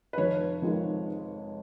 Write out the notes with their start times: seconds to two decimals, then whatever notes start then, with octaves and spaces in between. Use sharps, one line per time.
0.13 B4
0.18 F1 C#5
0.62 F2 D#3 G#3